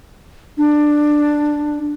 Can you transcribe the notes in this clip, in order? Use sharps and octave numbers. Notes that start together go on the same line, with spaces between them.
D4